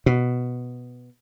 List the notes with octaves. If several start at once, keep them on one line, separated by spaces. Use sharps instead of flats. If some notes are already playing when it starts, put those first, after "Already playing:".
B2